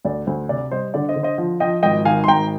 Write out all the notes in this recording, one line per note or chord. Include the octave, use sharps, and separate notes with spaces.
D2 D5
D2 C5
C3 D5
G3 C5 D#5
D3 D5
C5 D#5
D3
C5 D#5
F3
F3 D#5 G5
G#1 D#5 G5
D#3 F5 G#5
C6
G#1 G5 A#5